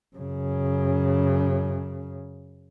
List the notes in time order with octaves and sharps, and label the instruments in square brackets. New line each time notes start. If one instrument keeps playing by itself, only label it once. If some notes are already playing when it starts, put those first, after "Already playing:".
[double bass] F#2 C#3